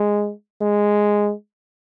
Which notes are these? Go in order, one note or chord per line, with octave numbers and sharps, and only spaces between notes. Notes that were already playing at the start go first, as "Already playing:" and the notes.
Already playing: G#3
G#3